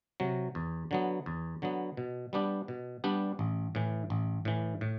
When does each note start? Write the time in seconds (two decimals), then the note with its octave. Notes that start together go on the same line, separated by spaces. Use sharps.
0.20 C3 F#3
0.55 E2
0.91 D3 F#3 B3
1.26 E2
1.62 D3 F#3 B3
1.97 B2
2.33 G3 B3 D4 G4
2.68 B2
3.04 G3 B3 D4 G4
3.39 A1
3.75 A2 E3
4.10 A1
4.45 A2 E3
4.81 A2